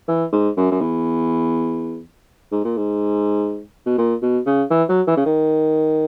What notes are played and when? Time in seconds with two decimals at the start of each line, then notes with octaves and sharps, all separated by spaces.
0.08 E3
0.32 G#2
0.57 F#2
0.71 F#2
0.81 E2
2.52 G#2
2.64 A#2
2.77 G#2
3.86 B2
3.98 A#2
4.22 B2
4.46 C#3
4.70 E3
4.89 F#3
5.07 E3
5.17 C#3
5.26 D#3